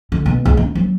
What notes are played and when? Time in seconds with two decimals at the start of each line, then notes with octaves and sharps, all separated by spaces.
0.12 D3
0.26 B2
0.45 C#2
0.57 D#4
0.75 F#3